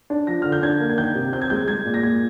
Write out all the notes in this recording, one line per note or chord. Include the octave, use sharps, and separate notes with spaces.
D4
F3 A#6
D3 F6
G6
D4 G#6
A#3
G#6
D#3 G6
C3
C4 G6
G#6
G#3 G6
G#3 G#6
A#2
A#6
A#2 G#6